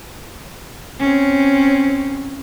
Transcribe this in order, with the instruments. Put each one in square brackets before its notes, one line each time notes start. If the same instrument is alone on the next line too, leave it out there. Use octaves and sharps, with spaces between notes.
[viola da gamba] C4 C#4